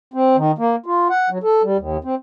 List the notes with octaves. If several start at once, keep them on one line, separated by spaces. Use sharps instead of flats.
C4
D#3
A#3
F4
F#5
F#3
A4
G3
D#2
C4